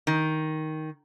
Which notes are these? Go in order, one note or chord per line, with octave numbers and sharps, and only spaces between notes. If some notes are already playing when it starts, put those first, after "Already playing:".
D#3